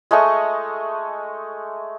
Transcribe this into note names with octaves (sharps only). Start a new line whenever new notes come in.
G#3 A3 D#5 C#6